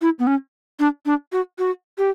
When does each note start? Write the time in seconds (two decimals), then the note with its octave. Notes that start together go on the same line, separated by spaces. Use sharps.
0.02 E4
0.19 B3
0.27 C#4
0.79 D4
1.06 D4
1.32 F#4
1.59 F#4
1.98 G4